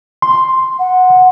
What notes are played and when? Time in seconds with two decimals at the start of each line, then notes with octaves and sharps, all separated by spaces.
0.22 C6
0.79 F#5